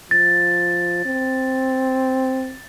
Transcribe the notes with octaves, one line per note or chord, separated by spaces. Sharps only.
F3 A6
C4